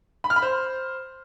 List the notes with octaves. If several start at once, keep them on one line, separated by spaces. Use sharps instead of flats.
B5
F6
B5
C5